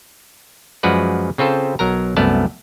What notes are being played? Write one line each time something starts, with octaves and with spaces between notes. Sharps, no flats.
F#2 F3 G#3 F#4 B4 D5
C#3 C4 F4 A4 C5
B1 F#3 A#4 A#5
C2 F#2 A3 B3 D5 A5